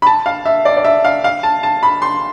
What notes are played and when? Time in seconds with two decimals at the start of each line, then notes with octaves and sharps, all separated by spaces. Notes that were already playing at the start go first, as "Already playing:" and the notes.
0.02 B5
0.07 A5
0.26 F5
0.45 E5
0.65 D5
0.77 D5
0.85 E5
1.04 F5
1.24 F5
1.43 A5
1.63 A5
1.83 B5
2.02 C6